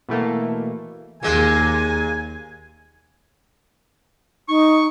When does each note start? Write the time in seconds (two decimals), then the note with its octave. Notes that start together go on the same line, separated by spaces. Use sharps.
0.09 B2 E3 A3 A#3
1.23 D#2 A#2 G#3 G#5
4.49 D#4 C#6